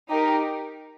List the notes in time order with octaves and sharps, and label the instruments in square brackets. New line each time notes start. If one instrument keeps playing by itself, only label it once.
[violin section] D#4 G4 A#4